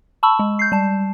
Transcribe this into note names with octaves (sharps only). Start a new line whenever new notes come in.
A5 B5 C#6 E6
G#3
G6 C7
G3 A5